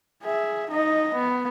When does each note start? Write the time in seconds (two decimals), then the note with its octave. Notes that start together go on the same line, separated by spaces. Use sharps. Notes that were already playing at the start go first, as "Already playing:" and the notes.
0.23 G#4 E5
0.71 D#4 D#5
1.14 B3